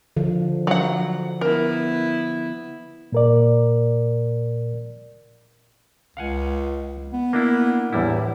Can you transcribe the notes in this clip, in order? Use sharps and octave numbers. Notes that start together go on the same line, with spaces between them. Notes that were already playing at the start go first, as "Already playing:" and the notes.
D3 F3
F#3 F#5
B3 E4 A#4
A#2 A#4 D5
C#2 F5 F#5 G#5
B3
A#3 D4 E4
E2 A2 G3 E4